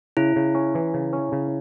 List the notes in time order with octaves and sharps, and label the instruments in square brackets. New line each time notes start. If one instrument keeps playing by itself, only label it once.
[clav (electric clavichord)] C#3 [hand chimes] E4
[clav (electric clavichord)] C#3
C#4
E3
C#3
C#4
C#3